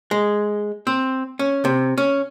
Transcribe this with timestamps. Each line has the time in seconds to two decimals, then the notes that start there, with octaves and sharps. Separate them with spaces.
0.11 G#3
0.87 C4
1.39 C#4
1.65 C3
1.98 C#4